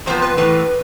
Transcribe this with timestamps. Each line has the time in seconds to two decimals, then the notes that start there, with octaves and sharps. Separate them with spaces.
0.06 F2 C3 F3 B3 C5
0.22 B4
0.37 A2 E3 A3 B4